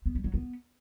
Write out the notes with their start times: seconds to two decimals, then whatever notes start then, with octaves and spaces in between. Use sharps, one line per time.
0.06 B3
0.15 G3
0.24 F#3
0.34 B3